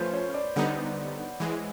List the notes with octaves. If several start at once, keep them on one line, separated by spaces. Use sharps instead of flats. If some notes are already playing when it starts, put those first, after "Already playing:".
Already playing: F3 A3 C#4 F4 B4 C5
C#5
D5
D3 G3 B3 D#4 F#5
E3 G#3